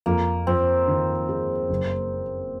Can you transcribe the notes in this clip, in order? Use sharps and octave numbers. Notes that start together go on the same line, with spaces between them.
F2 A#3
F2 C4
D#3
G#3
F#1